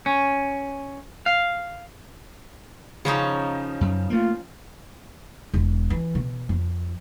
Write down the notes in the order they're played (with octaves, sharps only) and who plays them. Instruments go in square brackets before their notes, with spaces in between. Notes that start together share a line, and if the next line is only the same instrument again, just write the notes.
[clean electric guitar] C#4
F5
[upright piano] C#3 [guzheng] F3 C#4 D#4
[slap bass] F#2
[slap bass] A3 A#3 [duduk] F4
[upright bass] E1
E3
B2
F2